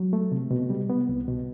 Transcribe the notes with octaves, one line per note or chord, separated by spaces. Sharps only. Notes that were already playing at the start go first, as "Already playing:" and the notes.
Already playing: F#3
A3
C3
B2
G3
B3
C2
B2